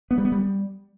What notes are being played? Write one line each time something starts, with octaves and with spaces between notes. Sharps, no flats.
B3
G3
B3
G3